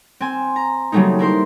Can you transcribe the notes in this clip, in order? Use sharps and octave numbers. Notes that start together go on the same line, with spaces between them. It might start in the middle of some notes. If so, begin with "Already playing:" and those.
C4 G#5
A#5
C#3 F#3 G3 A3 A#3 D#4
E4 A#4 C5 C6